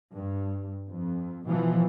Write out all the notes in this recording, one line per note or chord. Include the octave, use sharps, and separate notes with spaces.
G2
F2
B2 E3 F3